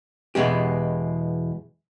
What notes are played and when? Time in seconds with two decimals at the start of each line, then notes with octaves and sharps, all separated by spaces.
0.35 E2 B2 G#3 G4